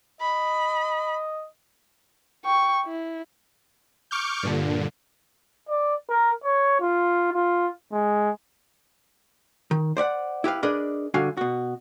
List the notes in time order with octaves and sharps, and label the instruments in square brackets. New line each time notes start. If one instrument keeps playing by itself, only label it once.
[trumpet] D#5 [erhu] B5
[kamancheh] G5 C#6
E4
[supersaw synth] C#6 D6 F6 G6
G2 A#2 D3
[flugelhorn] D5
A#4
C#5
F4
F4
G#3
[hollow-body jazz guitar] D#3
C5 D5 E5 F#5
E4 G4 B4 F5
D4 G#4 A#4 B4 D5 D#5
G2 D3 F#4 F5 G#5
B2 F#4